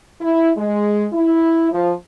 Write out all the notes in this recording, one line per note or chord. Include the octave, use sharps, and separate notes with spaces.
E4
G#3
E4
F3